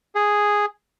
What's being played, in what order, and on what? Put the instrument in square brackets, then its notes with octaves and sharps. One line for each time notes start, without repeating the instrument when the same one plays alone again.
[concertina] G#4